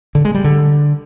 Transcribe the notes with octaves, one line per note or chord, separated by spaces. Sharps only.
D3
G#3
G3
D3